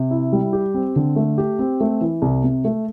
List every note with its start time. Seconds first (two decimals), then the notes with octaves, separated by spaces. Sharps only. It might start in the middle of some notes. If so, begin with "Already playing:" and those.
Already playing: C3
0.11 E4
0.33 G3
0.53 G4
0.75 C4
0.96 D3
1.16 A3
1.38 G4
1.59 C4
1.80 A3
2.01 E3
2.22 C2
2.44 C3
2.65 A3